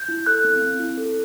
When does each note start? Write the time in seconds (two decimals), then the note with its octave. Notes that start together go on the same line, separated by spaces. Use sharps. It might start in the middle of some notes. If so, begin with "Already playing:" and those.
Already playing: G6
0.09 E4
0.26 A4 F#6
0.44 C4
0.62 C4
0.79 E4
0.97 A4